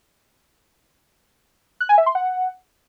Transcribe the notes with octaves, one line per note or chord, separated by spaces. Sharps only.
F#6
G#5
E5
C6
F#5